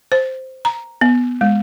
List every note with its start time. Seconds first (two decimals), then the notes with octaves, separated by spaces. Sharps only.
0.12 C5
0.65 A#5
1.01 B3
1.41 G#3